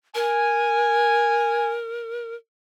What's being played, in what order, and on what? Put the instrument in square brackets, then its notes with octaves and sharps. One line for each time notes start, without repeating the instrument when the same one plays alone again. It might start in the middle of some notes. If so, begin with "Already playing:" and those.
[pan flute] A#4 [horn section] G#5